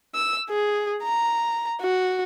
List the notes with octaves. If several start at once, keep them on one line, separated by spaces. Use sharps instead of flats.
E6
G#4
A#5
F#4